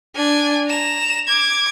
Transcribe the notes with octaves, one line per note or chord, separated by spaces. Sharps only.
D4 G#5
A#5 E7
D6 G#6